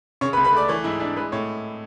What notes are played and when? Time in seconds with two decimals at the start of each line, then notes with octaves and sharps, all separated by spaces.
0.21 C#3 C#5 C#6
0.33 B4 B5
0.37 C#2
0.44 B4 B5
0.53 A3 D5 D6
0.68 E3 C#5 C#6
0.84 G#2 E4 E5
1.00 D4 E4 D5
1.16 G#3 B4
1.32 A2 C#5